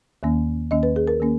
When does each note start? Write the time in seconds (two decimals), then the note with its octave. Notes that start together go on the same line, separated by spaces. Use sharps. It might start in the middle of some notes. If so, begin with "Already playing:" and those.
0.23 D#2 D#3 A#3 C#4
0.71 D#2 D#3 A#3 C#4 D#5
0.83 B4
0.96 G#4
1.07 A#4
1.20 D#3 A#3 C#4